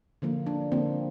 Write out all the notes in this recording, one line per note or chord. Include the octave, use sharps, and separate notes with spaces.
D3 F3 A#3
D4
D3 F3 A#3 C4